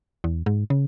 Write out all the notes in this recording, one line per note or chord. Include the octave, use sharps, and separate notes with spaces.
E2
G#2
C#3